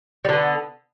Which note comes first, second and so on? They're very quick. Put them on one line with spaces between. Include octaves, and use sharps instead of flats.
G3 D3 B3